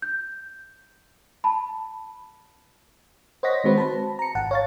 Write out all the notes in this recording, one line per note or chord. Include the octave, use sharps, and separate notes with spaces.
G6
A5 B5
C5 C#5 D#5 F#5 A#6 B6
D#3 G#3 C4 F#4 B4 C5
A5 B5
A#5 C#7
G#1 F#5 A5
C#5 F5 A6